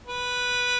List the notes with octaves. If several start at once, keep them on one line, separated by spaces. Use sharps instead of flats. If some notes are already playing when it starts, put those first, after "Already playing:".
B4